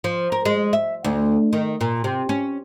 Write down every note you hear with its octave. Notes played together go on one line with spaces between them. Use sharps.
F3
A#4
G#3
E5
D2
D#3
A#2
C3
C#4